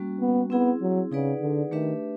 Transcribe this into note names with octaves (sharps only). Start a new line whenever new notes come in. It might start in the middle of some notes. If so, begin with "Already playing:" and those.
Already playing: G3 A#3 C#4 F#4
B3
B3 C4 E4 G#4
F#3
C#3 D#4 G#4 B4 D5 F#5
D3
D#3 A3 D4 G4 B4 E5